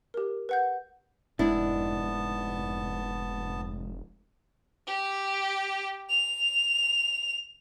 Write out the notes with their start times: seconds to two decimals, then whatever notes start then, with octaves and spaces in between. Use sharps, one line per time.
0.14 G4 A#4
0.49 B4 F#5 G6
1.39 F1 G#2 B3 D4 E4 A5
4.87 G4
6.10 F7